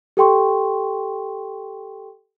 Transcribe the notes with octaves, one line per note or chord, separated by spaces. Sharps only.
G4 A4 G5 C6 C#6